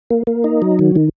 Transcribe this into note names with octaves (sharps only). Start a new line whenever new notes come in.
A#3
A#3
D#4
F#3
D#3
D#3